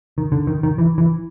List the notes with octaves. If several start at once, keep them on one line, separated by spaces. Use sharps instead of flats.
D#3
D3
D#3
D#3
E3
E3